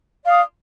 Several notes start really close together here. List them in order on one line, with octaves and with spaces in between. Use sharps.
D5 F5 D#6